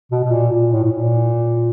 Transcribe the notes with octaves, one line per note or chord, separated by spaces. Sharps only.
B2
B2
A#2
A#2
A2
A2
A#2